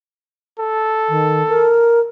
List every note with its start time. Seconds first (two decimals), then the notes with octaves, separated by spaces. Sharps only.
0.60 A4
1.09 D#3
1.48 A#4